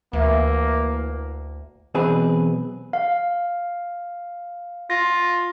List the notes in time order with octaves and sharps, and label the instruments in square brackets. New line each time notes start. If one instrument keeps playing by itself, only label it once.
[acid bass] D2 [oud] E3 [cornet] A#3
[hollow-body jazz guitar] B1 E2 B2 C4 G#4 B4
[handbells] F5
[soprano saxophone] F4 [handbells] A#6